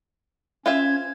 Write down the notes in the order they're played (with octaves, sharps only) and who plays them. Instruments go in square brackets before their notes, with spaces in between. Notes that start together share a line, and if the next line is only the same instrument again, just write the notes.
[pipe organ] C#4 G#6 [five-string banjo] F4 C5 E5